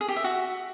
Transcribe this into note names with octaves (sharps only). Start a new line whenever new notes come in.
G#4
G4
E5
F#4